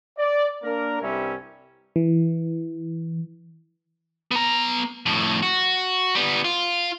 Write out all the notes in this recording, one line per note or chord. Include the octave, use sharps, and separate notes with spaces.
D5
A#3 D4 A#4
C2 G2 G3 C4 C#4 E5
E3
B3 A#5
F2 A2
F#4
G3 B3
F4